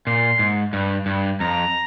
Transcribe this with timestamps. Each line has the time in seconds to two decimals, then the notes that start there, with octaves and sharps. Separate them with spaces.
0.07 A#2 C6
0.39 G#2
0.73 G2
1.06 G2
1.40 F2 A#5